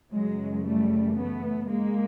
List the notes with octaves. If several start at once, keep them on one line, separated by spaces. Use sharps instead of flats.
F#2 C#3 E3 F#3 G#3
G3 A3
A3 B3
G#3 A#3